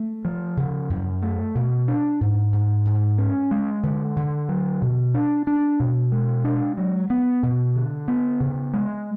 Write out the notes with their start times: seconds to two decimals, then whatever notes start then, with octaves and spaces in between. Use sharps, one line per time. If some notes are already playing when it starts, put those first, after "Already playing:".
Already playing: A3
0.25 F3
0.57 C#3
0.90 F#2
1.22 A3
1.55 B2
1.88 D4
2.21 G#2
2.53 G#2
2.85 G#2
3.18 C#4
3.51 G#3
3.83 D3
4.16 D3
4.49 F#3
4.82 B2
5.14 D4
5.47 D4
5.80 B2
6.12 G#3
6.44 D4
6.77 F#3
7.10 B3
7.43 B2
7.76 D3
8.08 B3
8.40 C#3
8.74 G#3